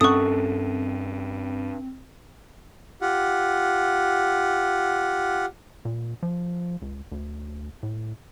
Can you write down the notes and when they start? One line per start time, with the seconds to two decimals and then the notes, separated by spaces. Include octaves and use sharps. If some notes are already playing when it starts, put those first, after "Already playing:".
0.01 G2 C4 C#4 A4 F#5 C#6 D#6
3.01 F4 G4 F#5
5.85 A#2
6.23 F3
6.82 C#2
7.12 D2
7.83 A2